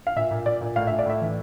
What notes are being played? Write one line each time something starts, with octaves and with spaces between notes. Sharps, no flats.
F5
A#2 E5
A#2
A#2 D5
A#2
A2 F5
A2 E5
D5
A2 E5
E3